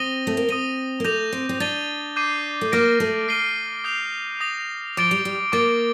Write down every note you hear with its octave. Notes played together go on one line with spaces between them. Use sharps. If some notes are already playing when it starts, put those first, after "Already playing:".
Already playing: C4 D#6 A#6 D#7 G7
A3
A#3
C4 D#6 A#6 D#7 G7
A#3
A3 D6 G6 A#6 F7
C4
C4
D4 A6 D#7 G7
D6 G6 C7 D#7
A3
A#3 D6 F6 A#6 D7
A3
F6 C7 D#7 G7
D#6 G6 C7 F7
D#6 A#6 F7
F3 D6 A6 D7 G7
G3
G3
A#3 D6 A6 D7 G7